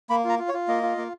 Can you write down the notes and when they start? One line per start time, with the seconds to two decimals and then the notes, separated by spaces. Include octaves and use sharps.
0.10 A#3 B5
0.24 F4 A#5
0.39 F4
0.48 C#5
0.54 F4
0.68 A#3 D#5
0.83 F4
0.98 A#3